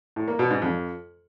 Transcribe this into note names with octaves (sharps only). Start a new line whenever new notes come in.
A2
A#3
B2
G#2
F2